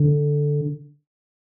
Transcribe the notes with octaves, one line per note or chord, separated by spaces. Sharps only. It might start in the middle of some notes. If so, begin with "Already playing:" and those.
Already playing: D3